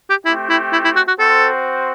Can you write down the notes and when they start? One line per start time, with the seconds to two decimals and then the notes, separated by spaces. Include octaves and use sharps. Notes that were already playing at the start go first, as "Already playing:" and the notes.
0.10 G4
0.25 A3 C4 E4 G4
0.49 E4
0.73 E4
0.85 E4
0.96 F#4
1.08 F#4
1.19 C4 F#4 A4 C5